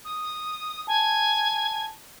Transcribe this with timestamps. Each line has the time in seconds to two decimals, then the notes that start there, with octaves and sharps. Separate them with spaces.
0.04 D#6
0.87 G#5 A5